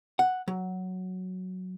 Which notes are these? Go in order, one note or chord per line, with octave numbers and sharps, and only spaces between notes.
F#5
F#3